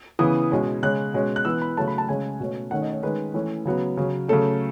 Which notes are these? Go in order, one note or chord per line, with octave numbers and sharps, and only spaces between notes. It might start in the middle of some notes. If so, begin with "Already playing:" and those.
C#3 E3 B3 D#6
B2 G#3 C#4
C#3 G#3 C#4 F#6
B2 G#3 C#4
F#6
E3 B3 E6
B5
C#3 F#3 A3 C#4 A5
B5
A5
C#3 G#3 C#4 G#5
B2 A3 C#4
D#3 A3 C#4 F#5
D#5
C#5
D#3 G#3 C#4 B4
E3 A3 C#4
C#3 F#3 B3
C#3 F#3 C#4
C#3 F#3 A3 C#4 A4